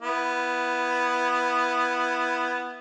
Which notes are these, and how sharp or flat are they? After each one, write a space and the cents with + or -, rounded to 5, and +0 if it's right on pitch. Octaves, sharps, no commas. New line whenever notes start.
B3 +0 E4 +15